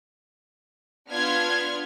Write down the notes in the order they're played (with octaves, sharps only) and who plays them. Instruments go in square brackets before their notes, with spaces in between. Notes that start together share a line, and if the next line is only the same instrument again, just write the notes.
[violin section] B3 D4 F4 F6 G#6